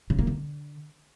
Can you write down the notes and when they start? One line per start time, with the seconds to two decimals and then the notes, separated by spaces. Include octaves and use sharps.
0.10 C#3
0.19 A#3
0.27 D3